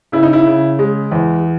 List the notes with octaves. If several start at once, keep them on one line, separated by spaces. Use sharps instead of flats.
C#3 E4
D#4
E4
C#3
G#3
E2